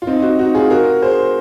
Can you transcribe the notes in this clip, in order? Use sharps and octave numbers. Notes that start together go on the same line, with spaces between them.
F4
C4 D#4
D#4 F#4
D#4 F#4
F4 G#4
F#4 A#4
G#4 C5